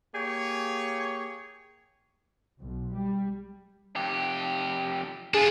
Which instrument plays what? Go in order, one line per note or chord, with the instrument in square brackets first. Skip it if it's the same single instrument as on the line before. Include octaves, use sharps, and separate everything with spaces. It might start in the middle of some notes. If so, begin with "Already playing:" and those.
[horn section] A#3 G4 G#4 C#5
[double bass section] B1
G3
[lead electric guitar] F2 G4
[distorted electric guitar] D4 F4 [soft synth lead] G#4